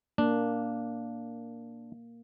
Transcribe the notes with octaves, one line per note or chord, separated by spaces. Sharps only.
A#3 D4